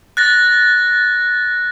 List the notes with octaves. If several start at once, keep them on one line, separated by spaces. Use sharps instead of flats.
F#6 A6 A#6